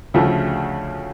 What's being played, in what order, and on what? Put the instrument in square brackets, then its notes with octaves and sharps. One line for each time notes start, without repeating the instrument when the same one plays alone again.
[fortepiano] D2 C#3 F3 A3